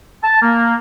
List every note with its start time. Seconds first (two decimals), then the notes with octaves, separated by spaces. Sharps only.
0.23 A5
0.42 A#3